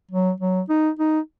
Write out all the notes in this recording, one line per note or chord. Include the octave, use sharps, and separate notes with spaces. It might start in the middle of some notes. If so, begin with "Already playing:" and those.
F#3
F#3
D#4
D#4